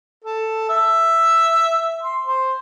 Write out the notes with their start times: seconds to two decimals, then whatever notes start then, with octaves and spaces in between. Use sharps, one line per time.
0.24 A4
0.69 E5
2.03 C6
2.25 C5